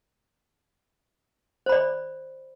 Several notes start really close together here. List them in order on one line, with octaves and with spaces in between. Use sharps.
C5 B5 D5